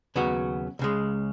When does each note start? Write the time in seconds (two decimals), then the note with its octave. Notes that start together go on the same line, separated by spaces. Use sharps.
0.16 D#2 C#3 F#3 B3 F#4
0.79 C#2 C#3 G#3